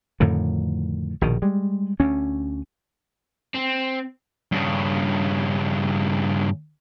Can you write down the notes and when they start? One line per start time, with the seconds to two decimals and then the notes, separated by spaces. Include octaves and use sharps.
0.20 F2 A2 D3 D#3
1.21 A#1 B2 D#3
1.42 G3 G#3
2.00 D2 C#4
3.54 C4
4.52 G2 C#3